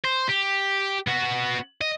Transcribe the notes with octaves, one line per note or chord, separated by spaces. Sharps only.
C5
G4
B3 F#4
D#5